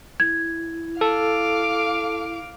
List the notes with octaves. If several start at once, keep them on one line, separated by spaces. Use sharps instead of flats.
E4 G#6
A4 F5 D6